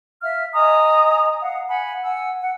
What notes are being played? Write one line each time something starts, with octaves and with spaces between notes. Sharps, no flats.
E5 F5 F6
D#5 G#5 A#5 D#6
F5 F#5
F#5 G#5 B5
F#5 G#5 E6
F#5